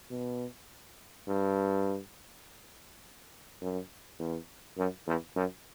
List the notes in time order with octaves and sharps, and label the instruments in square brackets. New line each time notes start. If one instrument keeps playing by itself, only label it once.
[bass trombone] B2
G2
F#2
E2
F#2
E2
F#2